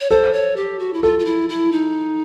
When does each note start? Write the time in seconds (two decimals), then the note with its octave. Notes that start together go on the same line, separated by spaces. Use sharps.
0.01 C#5
0.10 A4 C5
0.33 C#5
0.56 G4
0.79 F#4
0.94 E4
1.03 F4 A4
1.19 F4
1.25 E4
1.49 E4
1.72 D#4